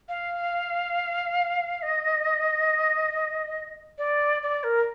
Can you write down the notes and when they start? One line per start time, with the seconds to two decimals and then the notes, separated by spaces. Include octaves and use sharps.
0.09 F5
1.82 D#5
3.98 D5
4.42 D5
4.64 A#4